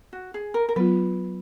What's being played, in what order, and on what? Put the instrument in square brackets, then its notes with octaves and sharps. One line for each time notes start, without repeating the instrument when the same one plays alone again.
[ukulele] F#4
G#4
A#4
A#4
[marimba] F#3 B3 F4 [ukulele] B4